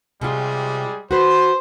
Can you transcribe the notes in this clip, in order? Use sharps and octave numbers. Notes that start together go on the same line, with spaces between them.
C3 G3 G#3 F4 G#4
F#4 B4 C5